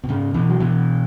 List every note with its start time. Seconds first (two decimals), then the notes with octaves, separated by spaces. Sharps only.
0.04 B2
0.09 G#2 C#3
0.34 B2 E3
0.49 F#3
0.60 B2 E3